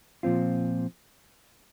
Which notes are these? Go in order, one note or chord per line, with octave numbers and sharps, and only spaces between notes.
A#2 F3 C4 F4